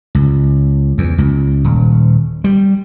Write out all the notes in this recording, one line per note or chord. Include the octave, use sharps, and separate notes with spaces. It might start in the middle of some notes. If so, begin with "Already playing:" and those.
C#2
E2
C#2
D#1
G3